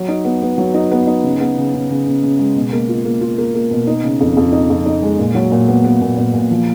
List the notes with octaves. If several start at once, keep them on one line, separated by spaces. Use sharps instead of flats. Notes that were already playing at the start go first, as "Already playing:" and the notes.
Already playing: F#3
D#4
B3
B3
F#3
D#4
B3
D#4
C#3
B3
C#3
C#3
C#3
C#3
C#3
G#3
B2
A#3
F4
A#3
F4
A#3
A#3
B2
D#4
C#3
F2
F2
D#4
F2
D#4
G#3
A#2
F#3
A#2
B3
B3
A#2
A#2
A#2
F3